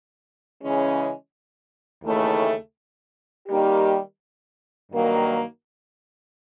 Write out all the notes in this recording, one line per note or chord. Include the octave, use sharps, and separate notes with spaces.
C#3 E3 G#3 C#4
D#2 C#3 E3 A3
D#3 G3 A#3 D#4 G4
G2 D#3 F#3 A#3